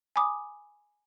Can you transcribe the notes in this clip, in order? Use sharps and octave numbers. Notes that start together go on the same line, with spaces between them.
G#5 B5 D6 D#6